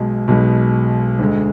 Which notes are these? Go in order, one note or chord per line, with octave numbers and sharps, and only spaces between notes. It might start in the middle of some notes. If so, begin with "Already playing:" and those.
Already playing: B1 B2 G#3
B1 B2 G#3
D2 D3 G#3